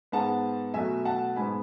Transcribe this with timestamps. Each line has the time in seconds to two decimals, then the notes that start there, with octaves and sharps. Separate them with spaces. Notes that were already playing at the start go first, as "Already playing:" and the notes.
0.12 G#2 G#3 B3 F#5 A5
0.74 B2 F#3 A3 E5 G#5
1.05 F#5 A5
1.36 G#2 G#3 B3 G#5 B5